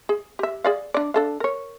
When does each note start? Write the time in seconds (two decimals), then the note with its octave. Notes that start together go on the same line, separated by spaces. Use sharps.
0.09 G#4
0.39 G4 E5
0.64 G#4 D5 F5
0.94 D4 D5
1.14 D4 A4 F5
1.40 A#4 C#5